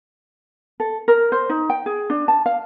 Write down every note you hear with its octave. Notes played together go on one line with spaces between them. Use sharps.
A4
A#4
C5
D#4
G5
G#4
D4
A5
F5